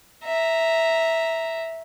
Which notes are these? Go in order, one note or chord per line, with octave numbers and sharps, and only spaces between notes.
E5 A#5